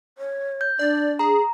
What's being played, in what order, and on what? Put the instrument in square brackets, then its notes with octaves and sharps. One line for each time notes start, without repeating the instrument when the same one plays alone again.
[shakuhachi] C#5
[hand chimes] G6
[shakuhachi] D4 [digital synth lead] D5
[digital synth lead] G#4 [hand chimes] A#5